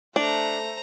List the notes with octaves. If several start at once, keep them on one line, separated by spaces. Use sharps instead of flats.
A3 D4 C5 A#5